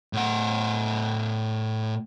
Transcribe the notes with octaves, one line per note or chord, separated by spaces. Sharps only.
A2 F#5